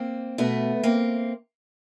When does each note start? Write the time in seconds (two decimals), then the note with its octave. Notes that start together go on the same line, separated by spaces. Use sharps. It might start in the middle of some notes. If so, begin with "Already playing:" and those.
Already playing: A#3 C4
0.38 B2 A3 B3
0.83 A#3 C4